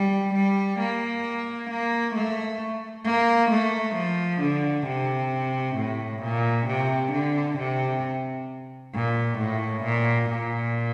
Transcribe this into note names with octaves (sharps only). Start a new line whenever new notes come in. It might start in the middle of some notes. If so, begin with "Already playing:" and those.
Already playing: G3
G3
A#3
A#3
A3
A#3
A3
F3
D3
C3
A2
A#2
C3
D3
C3
A#2
A2
A#2
A#2